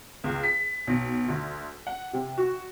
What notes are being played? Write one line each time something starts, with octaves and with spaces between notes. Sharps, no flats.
C#2
B6
B1
D2
F#5
C3
F#4